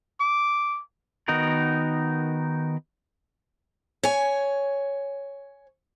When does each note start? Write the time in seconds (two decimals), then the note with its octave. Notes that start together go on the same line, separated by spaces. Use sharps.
0.20 D6
1.28 D#3 B3 D#4 F#4 A#4
4.03 C#5 G#5